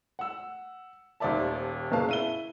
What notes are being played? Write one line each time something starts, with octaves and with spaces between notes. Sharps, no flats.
F#5 E6
D#1 D#2 C5 D5 E5 A5
F#1 B2 A#3 B3 F5 A5
E4 D#7 G7